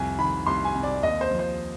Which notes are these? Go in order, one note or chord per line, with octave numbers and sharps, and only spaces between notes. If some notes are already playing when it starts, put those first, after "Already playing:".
Already playing: C2 F2 G#5
D#3 B5
C2 C6
G#5
C3
D5
D#2 D#5
C5
F3
C5